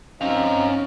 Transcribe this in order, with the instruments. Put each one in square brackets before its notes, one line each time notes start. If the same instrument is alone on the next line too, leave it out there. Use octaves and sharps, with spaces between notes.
[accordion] C4 D#4 F5 [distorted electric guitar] C#4 A#5